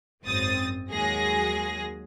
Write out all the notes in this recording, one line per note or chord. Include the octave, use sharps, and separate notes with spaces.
G#1 F#2 C4 D#6 A6
D#2 F#3 G#3 G#4 A#6